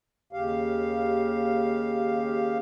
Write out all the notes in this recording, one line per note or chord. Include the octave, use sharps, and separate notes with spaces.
D#2 C#3 G4 F5